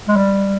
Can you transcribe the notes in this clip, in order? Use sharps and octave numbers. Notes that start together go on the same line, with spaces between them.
G#3
G3